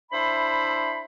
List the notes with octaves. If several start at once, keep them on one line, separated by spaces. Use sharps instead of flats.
D4 E4 C5 E5 B5